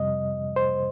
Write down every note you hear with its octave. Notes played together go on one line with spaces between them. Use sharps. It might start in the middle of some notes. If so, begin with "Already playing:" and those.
Already playing: F2 C3 G3 D#5
C5